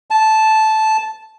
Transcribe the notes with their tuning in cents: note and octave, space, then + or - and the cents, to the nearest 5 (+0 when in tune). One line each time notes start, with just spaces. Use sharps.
A5 -10